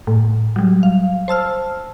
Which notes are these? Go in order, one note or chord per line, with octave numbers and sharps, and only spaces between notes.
A2
F#3 G3
F5
C5 A5 E6 F6